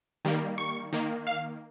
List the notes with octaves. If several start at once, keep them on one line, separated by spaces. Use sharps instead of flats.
D#3 G3 A#3
C#6
D#3 A#3
F5